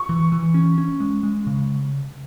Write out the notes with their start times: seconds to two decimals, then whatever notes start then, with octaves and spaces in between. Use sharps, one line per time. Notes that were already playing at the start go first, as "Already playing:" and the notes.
Already playing: C#6
0.09 E3
0.32 E3
0.54 C#4
0.78 C#4
1.00 G#3
1.23 G#3
1.47 C#3